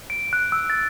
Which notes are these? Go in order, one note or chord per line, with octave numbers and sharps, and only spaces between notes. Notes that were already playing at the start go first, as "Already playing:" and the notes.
D7
F#6
E6
A6